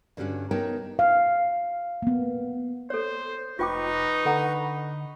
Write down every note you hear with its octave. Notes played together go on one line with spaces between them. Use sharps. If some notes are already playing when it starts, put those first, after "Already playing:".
G2 D3 G3 C#4 F#4
B3 D#4 A#4 C#5 G5 A5
F5
A#3 B3
A4 C5 C#5
F1 D#4 F4 B4 G5 C#6 D6
D3 A4 F#5 A#5